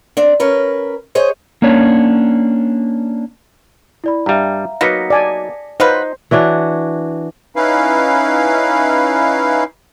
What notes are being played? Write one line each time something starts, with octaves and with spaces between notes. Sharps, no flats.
C4 D4
C#4 A#4 B4
G#4 C5 C#5 D#5
A#3 C#4 D4 C#5
E4 D5 B5
G2 G3 E5 F5 A#5
F#3 A#3 B3 D#4 A#6 B6 C#7
D5 G#5 A5
F#3 D#4 F4 B4 C5
E3 D4 F#4 C#5
C#4 D#4 E4 B4 F5